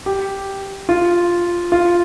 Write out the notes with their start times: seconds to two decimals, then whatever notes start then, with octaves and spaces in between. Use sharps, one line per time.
0.06 G4
0.89 F4
1.72 F4